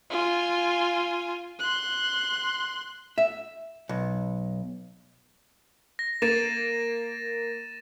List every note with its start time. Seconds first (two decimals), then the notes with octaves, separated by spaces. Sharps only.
0.11 F4 G#5
1.59 C6 F#6
3.18 E5
3.89 B1
5.99 A#6
6.22 A#3 A6 D#7 E7